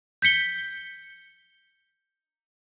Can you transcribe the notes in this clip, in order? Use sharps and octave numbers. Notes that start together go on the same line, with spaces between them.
G6 B6 C#7 G7